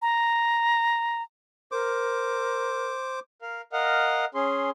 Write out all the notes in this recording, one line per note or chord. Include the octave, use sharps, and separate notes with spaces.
A#5
A#4 C5 D6
A#4 F5
A#4 D#5 F5 F#5
C#4 G#4 C6